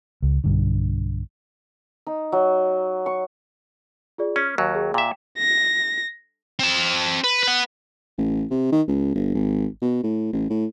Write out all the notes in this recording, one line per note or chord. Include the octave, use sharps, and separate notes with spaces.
C#2
B1 G2 D3
D#4
F#3
C#6
F4 G#4 D5
C#4 F6 B6
D#2 F#3
G#4
A#2 E5 G5
A#6
C4 A5
B4
B4 F#5
A1
C3
D#3
C#2
G1
G#1
B2
A2
A1
A2